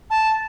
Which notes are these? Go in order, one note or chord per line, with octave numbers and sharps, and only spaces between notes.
A5